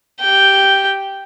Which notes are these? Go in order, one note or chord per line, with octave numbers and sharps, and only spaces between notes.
G4 G5